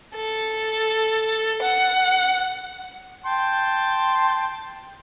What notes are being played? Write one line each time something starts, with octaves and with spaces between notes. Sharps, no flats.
A4
F#5
G5 A5 C6